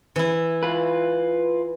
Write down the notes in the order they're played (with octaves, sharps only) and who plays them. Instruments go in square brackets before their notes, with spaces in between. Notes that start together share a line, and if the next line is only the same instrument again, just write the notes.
[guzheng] E3 E4
[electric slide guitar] F4 B4